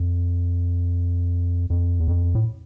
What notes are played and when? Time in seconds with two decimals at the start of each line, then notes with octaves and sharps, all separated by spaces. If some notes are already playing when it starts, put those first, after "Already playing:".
Already playing: F2
1.70 F2
2.00 E2
2.08 F2
2.35 A2